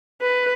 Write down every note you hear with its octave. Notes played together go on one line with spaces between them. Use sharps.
B4